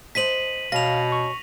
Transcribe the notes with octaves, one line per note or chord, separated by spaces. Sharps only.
C5 D#5 A5 B6 D#7 F#7
G2 B2 C#4 F5 A#6 F7
C#6